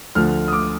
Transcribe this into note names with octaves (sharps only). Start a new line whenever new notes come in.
D2 D3 F3 F6
D#6
D6